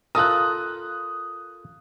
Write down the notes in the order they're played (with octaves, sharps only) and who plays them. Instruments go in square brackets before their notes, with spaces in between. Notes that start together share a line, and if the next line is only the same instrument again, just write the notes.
[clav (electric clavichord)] F4 A4 A#4 [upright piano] D#6 F#6